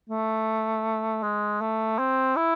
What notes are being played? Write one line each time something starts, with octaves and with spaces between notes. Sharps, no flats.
A3
G#3
A3
C4
E4